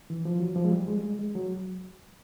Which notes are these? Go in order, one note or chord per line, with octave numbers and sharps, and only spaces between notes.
E3
F3
F#3
F3
G#3
G3
G#3
G#3
G#3
F#3